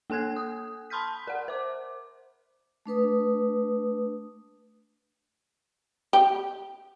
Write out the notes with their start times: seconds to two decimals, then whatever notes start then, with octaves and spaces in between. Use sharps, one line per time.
0.10 A#3 A4 G#5 F#6 G#6
0.36 D#6
0.90 A5 B5 C6 F6 G6 B6
1.27 A#4 F#5
1.48 C5 D6
2.86 A3 D4 B4 D#6
6.13 G4